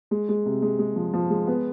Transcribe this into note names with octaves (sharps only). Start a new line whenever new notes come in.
G#3
G#3
C3
G#3
G#3
F3
F3
G#3
B3